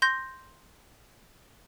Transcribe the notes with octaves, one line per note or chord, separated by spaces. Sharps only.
C6 G6 A#6